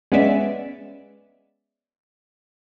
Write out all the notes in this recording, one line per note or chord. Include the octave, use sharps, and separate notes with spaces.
G#3 B3 C#4 D5 E5